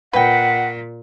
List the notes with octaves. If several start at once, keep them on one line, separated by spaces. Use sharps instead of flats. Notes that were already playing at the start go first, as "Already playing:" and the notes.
A#2 B4 F#5 G5